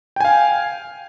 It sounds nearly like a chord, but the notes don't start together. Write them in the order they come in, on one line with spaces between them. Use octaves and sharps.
G5 G#5 F5